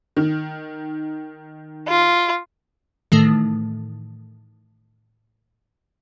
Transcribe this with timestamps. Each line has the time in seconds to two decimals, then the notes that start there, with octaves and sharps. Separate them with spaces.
0.17 D#3
1.88 F4
3.12 A2 D#3 E3 A3